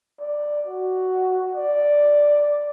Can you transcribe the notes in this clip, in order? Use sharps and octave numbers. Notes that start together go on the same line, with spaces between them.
D5
F#4
D5